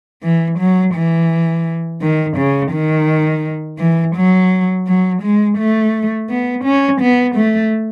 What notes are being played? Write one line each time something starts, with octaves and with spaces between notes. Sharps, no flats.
E3
F#3
E3
D#3
C#3
D#3
E3
F#3
F#3
G#3
A3
B3
C#4
B3
A3